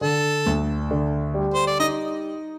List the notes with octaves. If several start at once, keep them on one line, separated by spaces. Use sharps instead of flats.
D3 A4
D2
D3
G3
C5
D5
D#4 D#5